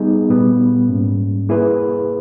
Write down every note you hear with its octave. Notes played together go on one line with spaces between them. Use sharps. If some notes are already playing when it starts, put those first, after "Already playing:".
Already playing: G3 B3 D#4 G#4
A#2 G3 B3
G#2 G3 A#3 C#4
A#3 E4 G#4 B4